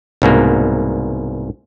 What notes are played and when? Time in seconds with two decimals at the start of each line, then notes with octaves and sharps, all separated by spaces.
0.22 C2 G#2 B2 A#3